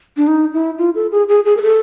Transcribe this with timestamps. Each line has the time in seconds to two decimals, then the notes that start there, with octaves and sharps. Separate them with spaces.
0.17 D4
0.27 D#4
0.53 E4
0.78 F4
0.95 A4
1.12 G#4
1.29 G#4
1.45 G#4
1.57 A#4
1.62 A4